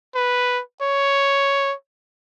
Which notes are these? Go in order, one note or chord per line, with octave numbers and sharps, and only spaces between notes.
B4
C#5